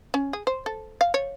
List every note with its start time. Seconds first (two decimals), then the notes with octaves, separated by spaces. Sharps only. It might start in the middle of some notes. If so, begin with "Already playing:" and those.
0.14 C#4
0.33 G#4
0.47 C5
0.66 A4
1.01 F5
1.14 C#5